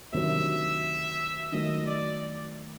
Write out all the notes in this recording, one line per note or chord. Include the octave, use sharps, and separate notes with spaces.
D2 C3 D#3 F#3 E5
D#3 F#3 A3 D#5
D5